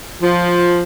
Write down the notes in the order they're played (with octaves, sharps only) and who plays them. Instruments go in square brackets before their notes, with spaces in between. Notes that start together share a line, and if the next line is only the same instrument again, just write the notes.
[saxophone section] F3